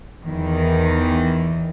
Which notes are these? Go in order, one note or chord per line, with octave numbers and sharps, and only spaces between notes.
E2 D#3 E3